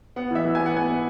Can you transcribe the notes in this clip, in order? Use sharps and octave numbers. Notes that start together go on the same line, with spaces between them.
B3 F#5
E3 E5
E3
B3 G#5
F#5
B3 G#5
B3